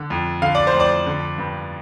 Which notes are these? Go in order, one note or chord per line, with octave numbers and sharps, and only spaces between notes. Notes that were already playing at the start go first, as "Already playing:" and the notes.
Already playing: D3
F2
D3 F5
D5
C5
F2
D5
D3
G2